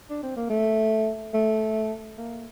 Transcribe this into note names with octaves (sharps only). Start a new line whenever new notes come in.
D4
C4
A#3
A3
A3
A#3